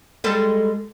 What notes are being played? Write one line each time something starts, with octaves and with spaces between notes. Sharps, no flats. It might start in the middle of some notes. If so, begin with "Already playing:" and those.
G3 G#3 A4